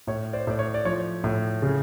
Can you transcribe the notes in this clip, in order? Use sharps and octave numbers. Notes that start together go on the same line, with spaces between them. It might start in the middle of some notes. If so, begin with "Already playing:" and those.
A2 C#5
C5 D5
A2 D5
C#5
D5
F3 C#5
A2
C#3